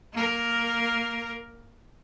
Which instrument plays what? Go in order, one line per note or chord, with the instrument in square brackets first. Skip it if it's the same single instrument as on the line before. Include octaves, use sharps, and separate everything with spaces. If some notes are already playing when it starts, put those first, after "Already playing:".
[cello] A#3 A#4